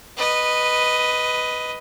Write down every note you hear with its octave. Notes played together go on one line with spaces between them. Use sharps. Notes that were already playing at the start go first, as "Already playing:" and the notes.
B4 D#5